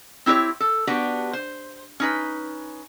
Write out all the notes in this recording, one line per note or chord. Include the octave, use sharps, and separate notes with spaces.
C4 E4 G4 A#4 C#5
A4
B3 D4 F#4 G4
C5
C#4 D#4 B4